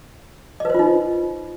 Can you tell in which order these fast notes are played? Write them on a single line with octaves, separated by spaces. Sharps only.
D#5 B4 C5 F4 D#4